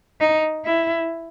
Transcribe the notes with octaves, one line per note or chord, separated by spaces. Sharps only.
D#4
E4